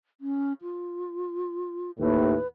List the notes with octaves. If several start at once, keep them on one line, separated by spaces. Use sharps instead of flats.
C#4
F4
D#2 A2 B4